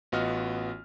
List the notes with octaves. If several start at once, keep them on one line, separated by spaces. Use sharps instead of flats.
A1 B3 F4 F#4 D#5 F6